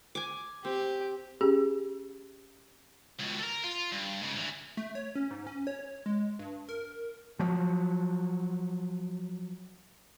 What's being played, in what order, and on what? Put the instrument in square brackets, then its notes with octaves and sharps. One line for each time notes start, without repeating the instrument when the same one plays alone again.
[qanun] G#5 D6
[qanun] C4 [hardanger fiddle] G4
[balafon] C#4 G4 G#4
[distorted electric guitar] C#2 B2
A4 A#4
F4
G2
G#2 C#3
D2 E3
[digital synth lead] A3
C#5
C#4
G#2
C#4
C#5
G#3
G2
A#4
[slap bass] F3 F#3